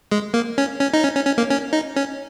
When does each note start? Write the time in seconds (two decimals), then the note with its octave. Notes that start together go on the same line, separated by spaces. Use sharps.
0.12 G#3
0.34 A#3
0.58 C#4
0.80 C#4
0.94 D#4
1.03 C#4
1.16 C#4
1.26 C#4
1.38 A#3
1.50 C#4
1.73 D#4
1.96 C#4